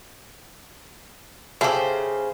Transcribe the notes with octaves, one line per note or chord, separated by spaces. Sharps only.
C#3 G4 A4 C5 E5